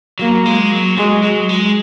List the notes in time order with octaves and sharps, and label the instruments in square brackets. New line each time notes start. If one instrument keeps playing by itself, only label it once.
[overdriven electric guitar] F#3 [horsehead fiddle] A#3
[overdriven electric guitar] G#3
F#3
[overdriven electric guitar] F#3 [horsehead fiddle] G#3
[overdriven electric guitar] F#3
G#3